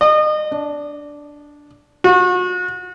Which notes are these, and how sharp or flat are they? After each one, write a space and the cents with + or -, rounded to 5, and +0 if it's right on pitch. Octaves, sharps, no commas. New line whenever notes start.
D#5 -30
D4 -5
F#4 -35